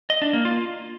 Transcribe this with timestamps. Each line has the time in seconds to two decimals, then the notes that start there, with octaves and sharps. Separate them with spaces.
0.10 D#5
0.22 D4
0.33 A#3
0.45 F4